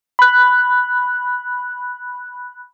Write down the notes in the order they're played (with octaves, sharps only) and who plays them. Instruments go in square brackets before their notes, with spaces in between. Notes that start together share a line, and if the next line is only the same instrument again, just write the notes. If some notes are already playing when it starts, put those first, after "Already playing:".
[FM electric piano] B5 F#6